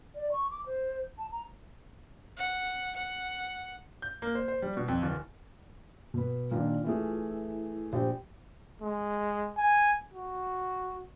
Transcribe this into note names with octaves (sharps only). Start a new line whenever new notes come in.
D5
C#6
D6
C5
A5
A#5
F#5
F#5
G6
A#3
C5
C5
G3
B2
F2
D1
B2 B4
A#2 D#3 D4 F4
E3 A3 G#4
E4
A#1 G4 C5 G5
G#3
G#5
F#4